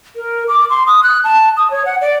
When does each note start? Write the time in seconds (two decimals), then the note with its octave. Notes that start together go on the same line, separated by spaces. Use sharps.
0.16 A#4
0.48 D6
0.70 C6
0.86 D#6
1.03 F#6
1.24 A5
1.57 D#6
1.71 C#5
1.85 F#5
2.01 D5